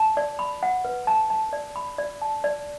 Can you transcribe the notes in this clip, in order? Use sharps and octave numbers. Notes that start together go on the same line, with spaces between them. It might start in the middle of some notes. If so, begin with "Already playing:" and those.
Already playing: A5
D5
B5
F#5
B4
A5
A5
D5
B5
D5
A5
D5